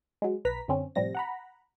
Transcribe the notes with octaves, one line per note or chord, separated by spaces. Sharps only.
F#3 G#3
B1 B4 A#5 B6
F#2 D3 C4 C#4
A2 C3 F3 G3 C4 A#6
F#5 A#5 B5